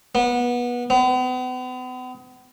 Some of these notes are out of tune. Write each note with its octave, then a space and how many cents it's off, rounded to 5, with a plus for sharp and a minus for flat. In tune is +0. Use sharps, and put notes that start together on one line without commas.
B3 -25
B3 +40